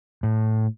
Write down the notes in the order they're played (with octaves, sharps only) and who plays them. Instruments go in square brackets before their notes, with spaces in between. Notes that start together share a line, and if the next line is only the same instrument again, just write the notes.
[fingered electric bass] A2